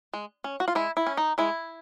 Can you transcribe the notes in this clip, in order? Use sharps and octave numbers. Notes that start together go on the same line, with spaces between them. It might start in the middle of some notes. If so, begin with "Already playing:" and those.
G#3
C#4
F#4
F4
G#3 E4
E4
C#4
D#4
G#3 E4